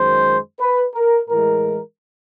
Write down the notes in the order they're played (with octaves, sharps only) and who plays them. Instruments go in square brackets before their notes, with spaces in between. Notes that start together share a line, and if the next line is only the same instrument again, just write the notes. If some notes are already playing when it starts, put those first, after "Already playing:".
Already playing: [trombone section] F#2 D#3 G#3 C5
B4
A#4
A2 E3 G#3 A#4